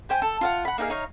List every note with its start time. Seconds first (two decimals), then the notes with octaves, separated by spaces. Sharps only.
0.09 G4 C5 G5 G#5
0.22 A4
0.41 F4 F5 F#5
0.65 F#5 B5
0.78 A#3 D#4 G#4 F5
0.90 D#4 C#5 F5